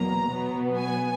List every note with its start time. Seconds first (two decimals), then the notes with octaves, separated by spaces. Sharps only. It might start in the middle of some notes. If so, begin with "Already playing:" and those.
Already playing: E2 B2 F#3 A#3 A#5
0.32 B2 F#3 B3
0.79 G#5